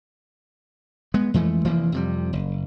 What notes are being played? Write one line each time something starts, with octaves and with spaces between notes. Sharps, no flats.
G#3 B3
F2 E3 G#3 A3
F1 E3 F3 A#3
F2 C3 G3
F#1